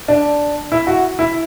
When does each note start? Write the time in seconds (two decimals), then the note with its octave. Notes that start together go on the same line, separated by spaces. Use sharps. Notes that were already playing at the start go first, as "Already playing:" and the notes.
0.08 D4
0.72 E4
0.87 F#4
1.19 E4